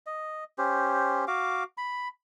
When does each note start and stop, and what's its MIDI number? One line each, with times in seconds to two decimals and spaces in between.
0.06 0.44 75
0.58 1.25 61
0.58 1.25 67
0.58 1.25 72
1.28 1.64 66
1.28 1.64 77
1.28 1.64 86
1.78 2.08 83